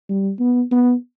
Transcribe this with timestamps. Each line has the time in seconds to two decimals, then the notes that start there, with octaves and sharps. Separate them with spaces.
0.09 G3
0.40 B3
0.72 B3